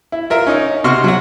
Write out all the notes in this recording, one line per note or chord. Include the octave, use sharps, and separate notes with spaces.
E4
F4 A#4 E5
C#4 D#4 D#5
C3 F#4 C6 C#6 F6
F#3 F#4